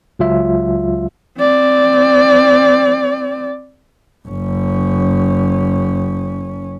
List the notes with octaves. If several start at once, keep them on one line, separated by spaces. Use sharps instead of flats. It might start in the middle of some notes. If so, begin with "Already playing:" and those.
C#2 F#3 F4 E5
C4 D5
F#1 C#4